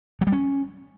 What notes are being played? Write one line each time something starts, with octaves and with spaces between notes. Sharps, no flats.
F#3
G3
C#4